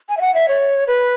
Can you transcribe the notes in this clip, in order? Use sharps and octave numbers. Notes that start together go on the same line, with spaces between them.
G#5
E5
F#5
E5
C#5
B4